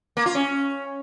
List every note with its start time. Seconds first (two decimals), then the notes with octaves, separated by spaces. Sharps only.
0.17 A#3
0.26 F4
0.35 C#4